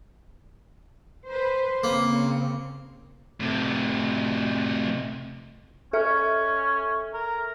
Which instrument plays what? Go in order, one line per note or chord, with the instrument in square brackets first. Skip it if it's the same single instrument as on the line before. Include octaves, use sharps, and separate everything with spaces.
[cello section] B4 C5
[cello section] C#3 C4 [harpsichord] A#3
[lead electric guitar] A2 C3
[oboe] C#4 [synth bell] A4 E5 F6
[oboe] A#4